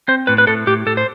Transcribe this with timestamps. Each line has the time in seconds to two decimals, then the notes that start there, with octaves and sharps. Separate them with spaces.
0.08 C4 C5
0.27 A2 B4
0.38 B4
0.47 A2 A4
0.67 A2 G4
0.86 A2 A4
0.97 C5